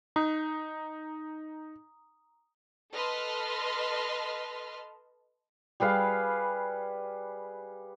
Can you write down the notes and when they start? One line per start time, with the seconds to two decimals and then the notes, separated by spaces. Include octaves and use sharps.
0.16 D#4 A#5 D#6
2.93 A4 B4 D#5 A5 C6 F6
5.80 G3 G#4 B4 F5